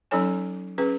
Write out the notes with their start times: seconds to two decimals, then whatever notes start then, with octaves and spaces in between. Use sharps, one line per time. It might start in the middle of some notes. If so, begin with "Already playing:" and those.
0.11 F#3 C#4 D#4 A4 C#5 G#5
0.78 C#4 G#4 B4